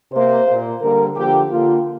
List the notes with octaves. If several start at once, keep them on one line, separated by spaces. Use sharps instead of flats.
C3 A#3 C5
A#2 A#3
D3 G3 A#3 A#4
D3 F3 A#3 G4
D3 A#3 F4